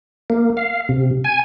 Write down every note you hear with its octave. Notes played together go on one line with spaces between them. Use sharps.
A#3
F5
C3
G#5